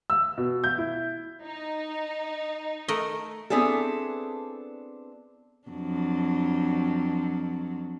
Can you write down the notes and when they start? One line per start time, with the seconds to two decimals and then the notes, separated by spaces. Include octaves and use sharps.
0.10 E6
0.38 B2
0.64 G6
0.78 E4
1.43 D#4
2.88 A3 A#4 D#5
3.50 B3 C4 D4 E4 G#4 A4
5.68 F2 F#3 D4